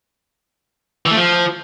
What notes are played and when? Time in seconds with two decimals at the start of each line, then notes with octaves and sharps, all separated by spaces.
1.06 E3
1.11 A3
1.16 F3